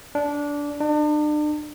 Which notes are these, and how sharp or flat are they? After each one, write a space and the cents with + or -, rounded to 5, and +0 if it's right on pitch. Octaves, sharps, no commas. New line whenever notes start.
D4 -15
D4 +40